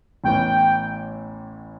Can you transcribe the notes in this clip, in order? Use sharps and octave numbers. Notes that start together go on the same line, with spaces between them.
A1 A2 E3 B3 G5